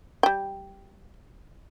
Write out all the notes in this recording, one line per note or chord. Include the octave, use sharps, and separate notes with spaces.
G3 G5